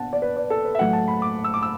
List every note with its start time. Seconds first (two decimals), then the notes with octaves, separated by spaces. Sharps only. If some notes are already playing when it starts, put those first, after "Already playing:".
Already playing: B2 B3 D4 F#5 A5
0.13 D5
0.22 B4
0.37 D5
0.50 A4
0.65 B4
0.75 E5
0.79 A2 F#3 A3 F#5
0.93 A5
1.08 B5
1.22 D6
1.44 E6
1.54 D6
1.62 E6